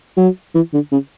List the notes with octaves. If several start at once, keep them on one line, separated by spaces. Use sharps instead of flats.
F#3
E3
D3
C#3